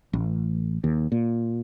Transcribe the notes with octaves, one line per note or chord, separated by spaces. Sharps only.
A1
D#2
A#2